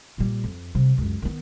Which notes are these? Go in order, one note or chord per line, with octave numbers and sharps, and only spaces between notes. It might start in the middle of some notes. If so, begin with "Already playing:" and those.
A#2 G3
F2
C3 G3
C#2 F#2
D#3 B3